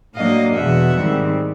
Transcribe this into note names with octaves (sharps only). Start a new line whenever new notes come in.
A2 F#3 A#3 D4 D#5 F5
E2 B2 G#3 E5 F#5
G#2 D#3 G3 C4